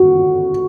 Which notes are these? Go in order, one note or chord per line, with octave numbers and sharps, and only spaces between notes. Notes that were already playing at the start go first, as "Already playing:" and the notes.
Already playing: F#4